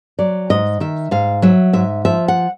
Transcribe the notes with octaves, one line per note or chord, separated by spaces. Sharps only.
F#3 D5
G#2 D#5
D#3 E5
G#2 F5
F#3 E5
G#2 E5
F3 E5
F#5